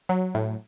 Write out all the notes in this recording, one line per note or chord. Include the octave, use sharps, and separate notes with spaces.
F#3
A2